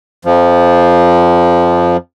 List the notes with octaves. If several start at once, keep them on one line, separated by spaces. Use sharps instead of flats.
F2 F3